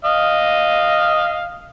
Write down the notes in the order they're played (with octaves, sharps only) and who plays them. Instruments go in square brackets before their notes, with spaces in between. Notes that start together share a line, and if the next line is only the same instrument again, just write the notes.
[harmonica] D#5 F5